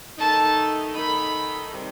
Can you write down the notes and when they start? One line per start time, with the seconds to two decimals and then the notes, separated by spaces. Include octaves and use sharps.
0.18 D#3 A3 D#4 A5
0.96 D#3 A3 D#4 B5
1.73 C3 D#3 G3 C4 D#4